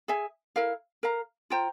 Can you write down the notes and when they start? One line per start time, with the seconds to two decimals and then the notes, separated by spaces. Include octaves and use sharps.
0.08 G#4 E5 G#5
0.56 E4 A#4 F5
1.03 A#4 F5 A#5
1.50 F4 C5 G5 A#5